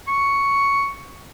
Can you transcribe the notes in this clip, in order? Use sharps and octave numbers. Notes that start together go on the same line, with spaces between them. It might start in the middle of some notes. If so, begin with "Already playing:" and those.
C#6